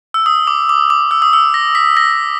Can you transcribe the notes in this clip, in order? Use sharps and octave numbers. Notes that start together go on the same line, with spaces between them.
E6
D#6
D6
D6
D6
E6
D#6
E6
A#6
B6
A#6